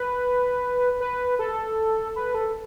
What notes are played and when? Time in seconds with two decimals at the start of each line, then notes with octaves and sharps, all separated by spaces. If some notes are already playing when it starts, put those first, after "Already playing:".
Already playing: B4
1.00 B4
1.39 A4
2.16 B4
2.35 A4